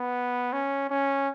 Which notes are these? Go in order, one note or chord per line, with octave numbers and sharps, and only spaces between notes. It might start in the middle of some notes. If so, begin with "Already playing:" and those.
Already playing: B3
C#4
C#4